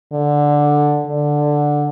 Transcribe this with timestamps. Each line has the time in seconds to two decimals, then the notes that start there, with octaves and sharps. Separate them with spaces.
0.13 D3
1.06 D3